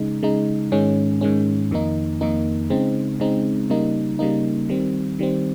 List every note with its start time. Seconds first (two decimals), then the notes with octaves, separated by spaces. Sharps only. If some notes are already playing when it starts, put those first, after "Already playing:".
Already playing: C#3 G#3 D#4
0.23 C#3 G#3 D#4
0.72 G#2 D#3 G#3 C#4
1.21 G#2 D#3 G#3 C#4
1.71 F2 D#3 A#3 D#4
2.21 F2 D#3 A#3 D#4
2.70 C#3 G#3 C4 D#4
3.20 C#3 G#3 C4 D#4
3.70 C#3 G3 A#3 D#4
4.19 C#3 G3 A#3 D#4
4.69 D#3 G3 C4
5.19 D#3 G3 C4